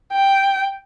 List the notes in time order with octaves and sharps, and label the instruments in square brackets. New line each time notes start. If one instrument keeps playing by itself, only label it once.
[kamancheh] G5